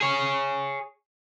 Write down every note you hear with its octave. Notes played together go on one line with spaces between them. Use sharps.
G#4 C#5